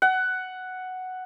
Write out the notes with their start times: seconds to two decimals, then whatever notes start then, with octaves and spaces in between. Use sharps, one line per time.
0.02 F#5